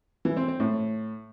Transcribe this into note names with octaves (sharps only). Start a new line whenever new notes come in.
E3
C4
C4
A2